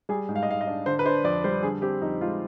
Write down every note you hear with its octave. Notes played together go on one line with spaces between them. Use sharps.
G3 G#4
G#2
F5
D#5
G#2 F5
D#5
D4
D3 C5
B4
D4 C5
F2 D5
G3 C5
D3 G#4
C4 G4
F2 D#4
G#3 F4